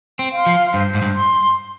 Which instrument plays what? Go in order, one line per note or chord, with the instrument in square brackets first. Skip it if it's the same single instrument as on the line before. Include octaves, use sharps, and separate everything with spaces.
[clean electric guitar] C4
[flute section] F5 C6
[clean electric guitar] F3
[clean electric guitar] G2 [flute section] C5
[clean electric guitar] G#2
G2
[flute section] C6